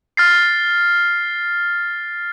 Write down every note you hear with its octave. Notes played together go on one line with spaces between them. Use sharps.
F6 A6 C7